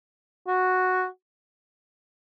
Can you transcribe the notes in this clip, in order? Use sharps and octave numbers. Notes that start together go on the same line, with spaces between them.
F#4